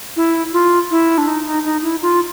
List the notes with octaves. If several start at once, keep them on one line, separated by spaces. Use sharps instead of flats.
E4
F4
E4
D4
D#4
D#4
D#4
E4
F4